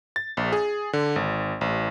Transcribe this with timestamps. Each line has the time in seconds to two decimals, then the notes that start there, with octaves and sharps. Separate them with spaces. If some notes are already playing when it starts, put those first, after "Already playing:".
0.16 A6
0.37 A#1
0.52 G#4
0.93 D3
1.16 G#1
1.61 A1